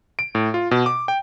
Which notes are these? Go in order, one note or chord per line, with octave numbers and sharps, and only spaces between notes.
D7
A2
F4
B2
D6
G5